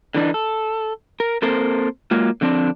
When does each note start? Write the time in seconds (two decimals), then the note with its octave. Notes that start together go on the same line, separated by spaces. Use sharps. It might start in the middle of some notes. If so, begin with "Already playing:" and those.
0.15 D3 E3 D4 D#4
0.34 A4
1.20 A#4
1.42 A#3 C4 A4 A#4 C5
2.11 F#3 G#3 A#3 F4
2.41 D3 F3 C4 D4